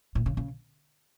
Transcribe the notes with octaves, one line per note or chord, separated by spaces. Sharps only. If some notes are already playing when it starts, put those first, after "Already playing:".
A2
C#3
C#3